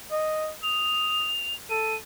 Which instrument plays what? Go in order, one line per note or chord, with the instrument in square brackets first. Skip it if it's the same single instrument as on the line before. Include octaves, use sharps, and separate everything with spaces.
[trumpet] D#5
[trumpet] D#6 [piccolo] F7
[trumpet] A4 [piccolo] D#7